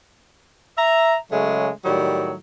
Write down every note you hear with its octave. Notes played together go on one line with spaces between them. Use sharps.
E5 A#5
C#3 F#3 G#3 A3
A2 D#3 F#3 G3